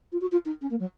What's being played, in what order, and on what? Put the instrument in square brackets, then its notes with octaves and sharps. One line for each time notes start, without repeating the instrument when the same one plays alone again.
[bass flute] F4
F#4
F4
D#4
C#4
A#3
F#3